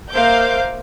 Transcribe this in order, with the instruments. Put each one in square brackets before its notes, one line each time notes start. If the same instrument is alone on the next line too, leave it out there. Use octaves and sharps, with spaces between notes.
[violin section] A#3 C5 E5 F5 D6 G6